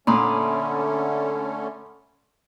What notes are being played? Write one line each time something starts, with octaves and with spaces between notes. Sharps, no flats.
A#2 D3 A3 C#4 B5 C6 D#6